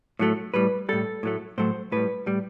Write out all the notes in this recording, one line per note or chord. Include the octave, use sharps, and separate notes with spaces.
A2 F#3 A3
A2 G3 B4
A2 G3 A4
A2 F#3 A3
A2 F#3 A3 C5
A2 G3 B4
A2 G3